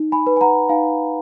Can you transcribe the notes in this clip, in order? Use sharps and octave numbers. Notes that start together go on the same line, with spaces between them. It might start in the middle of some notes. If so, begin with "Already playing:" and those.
Already playing: D#4
G#5 B5
B4
G#5
F#5 A#5
D#4 F5 G#5